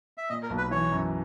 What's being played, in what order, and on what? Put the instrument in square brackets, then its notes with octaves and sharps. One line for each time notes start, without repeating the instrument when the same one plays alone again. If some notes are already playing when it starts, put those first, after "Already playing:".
[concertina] E5
[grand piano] A#2 [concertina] D#5
[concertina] A#4
[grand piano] B1
[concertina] B4
[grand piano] E3 [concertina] C#5
[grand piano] F#2